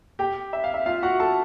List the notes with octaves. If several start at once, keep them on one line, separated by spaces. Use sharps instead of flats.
G4 G5
E5
F5
E5
F4 F5
F#4 F#5
A4 A5